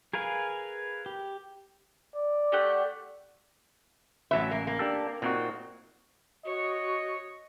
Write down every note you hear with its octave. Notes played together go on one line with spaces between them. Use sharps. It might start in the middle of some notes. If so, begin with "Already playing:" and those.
G#4 A#4 B4 F5 G#5
G4
D5
A3 G4 F#5
A1 F#3 B4 E5
A#3
A#3
D4 G4 A4
A#2 C4 D#4 F#4
F#4 C#5 D#5